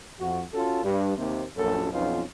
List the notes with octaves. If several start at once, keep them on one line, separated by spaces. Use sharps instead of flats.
F2 F#4
C#4 F4 F#4 A4
G2
D#2 C3
A#1 F#2 A4
B1 F2 B3 C#4 D#4 F4